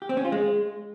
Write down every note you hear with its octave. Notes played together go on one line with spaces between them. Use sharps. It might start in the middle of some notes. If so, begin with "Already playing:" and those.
G4
C4
C#4
F4
G#3